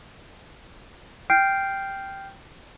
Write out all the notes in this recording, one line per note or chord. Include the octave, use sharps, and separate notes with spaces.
G5 F6 G6 C7 D7